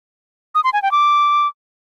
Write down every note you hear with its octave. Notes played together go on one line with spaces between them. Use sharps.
D#6
C6
G#5
G5
D6